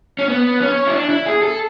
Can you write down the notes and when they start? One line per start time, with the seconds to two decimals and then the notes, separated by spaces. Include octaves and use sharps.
0.19 C#4
0.29 B3
0.61 C#4
0.87 E4
0.94 D4
1.09 E4
1.26 G#4
1.43 A4